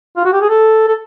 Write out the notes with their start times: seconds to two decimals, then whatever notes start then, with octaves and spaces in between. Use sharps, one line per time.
0.17 F4
0.25 F#4
0.33 G4
0.41 G#4
0.49 A4
0.88 A4